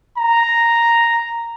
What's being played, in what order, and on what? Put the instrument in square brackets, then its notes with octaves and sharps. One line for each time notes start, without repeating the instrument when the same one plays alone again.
[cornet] A#5